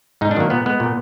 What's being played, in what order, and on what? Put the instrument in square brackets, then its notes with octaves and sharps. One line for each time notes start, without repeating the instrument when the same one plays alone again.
[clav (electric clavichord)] G#2 D#4
D4
D#3 F#3 A#3
A#2 B3
G#3 B3
A#2